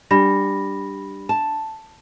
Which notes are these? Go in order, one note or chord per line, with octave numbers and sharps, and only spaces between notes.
G3 D4 B5 A#6
A5